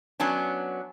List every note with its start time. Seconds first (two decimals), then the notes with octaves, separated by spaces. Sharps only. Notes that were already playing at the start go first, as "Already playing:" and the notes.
0.20 F#3 B3 C#4 D4